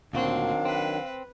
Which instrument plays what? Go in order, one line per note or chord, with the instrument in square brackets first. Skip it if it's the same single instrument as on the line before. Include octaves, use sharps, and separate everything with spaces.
[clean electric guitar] D2 A#2 F#4 [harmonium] D#3 F#3 D4 [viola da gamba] C4 [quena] F5
[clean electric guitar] C4 [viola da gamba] B4